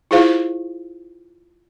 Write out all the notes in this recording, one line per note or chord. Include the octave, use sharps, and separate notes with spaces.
E4 F4 G#4 C5 F5